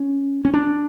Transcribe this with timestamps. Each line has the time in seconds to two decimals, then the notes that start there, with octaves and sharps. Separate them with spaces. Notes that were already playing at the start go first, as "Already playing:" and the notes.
Already playing: C#4
0.45 C#4
0.54 D4